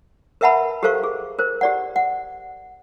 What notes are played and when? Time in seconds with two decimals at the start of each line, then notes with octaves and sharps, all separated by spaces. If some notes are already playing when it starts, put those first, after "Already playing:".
0.41 A#4 B4 E5 F#5 A5 B5
0.83 G4 A4 A#4 C5 F5 C#6
1.03 G#4
1.39 A#4 C5
1.61 G4 D5 F#5
1.96 F#5